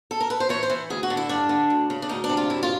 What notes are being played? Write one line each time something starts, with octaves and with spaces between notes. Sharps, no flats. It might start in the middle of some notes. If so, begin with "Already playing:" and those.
A4
A#4
B4
C5
E3 C#5
C5
E3
D2 G#4
F#4
D3
E4
G2 D4
D3
D2
C#3
D4
D2 D#4
D4
C3
F4
F#2 E4
F4